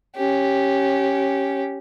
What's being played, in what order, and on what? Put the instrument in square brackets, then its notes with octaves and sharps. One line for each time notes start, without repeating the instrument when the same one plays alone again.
[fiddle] C#4 G4